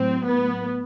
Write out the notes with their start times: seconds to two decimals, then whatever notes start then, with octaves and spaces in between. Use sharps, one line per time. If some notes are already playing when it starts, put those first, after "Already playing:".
Already playing: A2 F#3 C4
0.26 B3